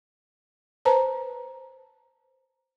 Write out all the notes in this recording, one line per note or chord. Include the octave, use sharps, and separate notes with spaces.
B4 C5 A5 A#5